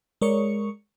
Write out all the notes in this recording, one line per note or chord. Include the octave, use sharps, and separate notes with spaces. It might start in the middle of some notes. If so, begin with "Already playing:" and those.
G#3 A#4 C#5 D5 C#6 C#7